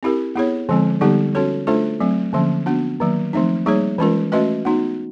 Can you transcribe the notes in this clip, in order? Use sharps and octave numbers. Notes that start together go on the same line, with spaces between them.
C4 E4 G4 A#4
B3 E4 G#4 C#5
D3 F3 G#3 C4
D3 G3 B3 D#4 G4
C#4 F#4 A4 C#5
A3 D4 F4 A4 C5
F#3 A3 C4
D3 F3 A#3 C#4
B3 D4 F#4
D#3 F#3 A#3
F3 A3 C4 D#4
G3 A#3 D#4 G#4 C#5
E3 G#3 C#4 F4 A#4
A3 C#4 F#4 B4 D#5
B3 D#4 F#4